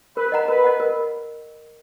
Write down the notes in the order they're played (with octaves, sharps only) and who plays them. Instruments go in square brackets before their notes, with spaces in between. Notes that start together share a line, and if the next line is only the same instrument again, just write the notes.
[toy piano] A#4 [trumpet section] B4
[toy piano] D#5 F#5 A#5
[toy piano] A#4 [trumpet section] B4
[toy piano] D#5 F#5
A#4